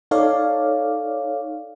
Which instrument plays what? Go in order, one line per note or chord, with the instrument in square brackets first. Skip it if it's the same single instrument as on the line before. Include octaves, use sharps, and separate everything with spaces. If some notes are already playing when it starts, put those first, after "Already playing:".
[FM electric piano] D#4 A4 C#5 D5 F5